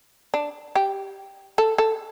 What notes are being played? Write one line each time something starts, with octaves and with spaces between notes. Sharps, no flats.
D4
G4
A4
A4